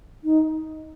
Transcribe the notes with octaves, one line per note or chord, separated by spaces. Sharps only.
D#4